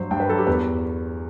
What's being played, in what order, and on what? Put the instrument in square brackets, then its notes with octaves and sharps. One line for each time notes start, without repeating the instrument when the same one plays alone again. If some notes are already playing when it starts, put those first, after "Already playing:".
Already playing: [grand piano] G2 F#3 C5
G2 G5
B4
F#3 A4
G4
E2 B4